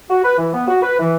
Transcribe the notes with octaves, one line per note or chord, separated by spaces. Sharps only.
F#4
B4
E3
B3
F#4
B4
E3